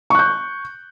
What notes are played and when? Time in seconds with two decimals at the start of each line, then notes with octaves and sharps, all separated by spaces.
0.10 C#6
0.15 F#6
0.19 G6